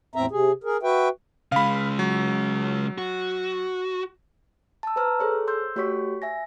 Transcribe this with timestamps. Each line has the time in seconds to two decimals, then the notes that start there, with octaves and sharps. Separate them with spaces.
0.15 E2 A2 C4 E5 A#5
0.31 C3 G#4
0.64 G#4 A#4
0.83 F#4 B4 E5 G5
1.52 C#3 G#3 F5 B5
1.99 F#3
2.98 F#4
4.83 A5 E6
4.96 B4 C5 A#5 E6 F6
5.20 G#4 A4 C5 C#5
5.48 C6 E6 G6
5.76 A3 F#4 G4 C#5 C#6 B6
6.22 E5 G#5 A#6